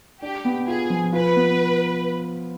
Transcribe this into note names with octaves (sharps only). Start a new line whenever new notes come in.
D4 G4
B3
F4 G#4
F3
F4 B4
B3